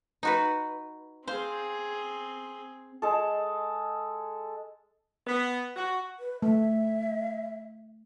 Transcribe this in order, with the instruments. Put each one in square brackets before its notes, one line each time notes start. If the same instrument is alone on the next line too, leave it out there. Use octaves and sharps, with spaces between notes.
[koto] D#4 F#4 B4
[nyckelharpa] C4 G#4 [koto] C5 F5
[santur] G#3 A4
[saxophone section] B3
F#4
[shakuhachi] B4
[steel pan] A3 [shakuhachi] E5